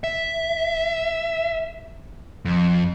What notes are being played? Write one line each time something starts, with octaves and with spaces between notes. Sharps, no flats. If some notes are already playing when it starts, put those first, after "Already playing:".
E5
F2